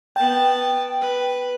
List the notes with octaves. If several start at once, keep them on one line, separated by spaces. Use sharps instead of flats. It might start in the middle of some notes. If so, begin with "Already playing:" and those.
B3 G5 A5
B4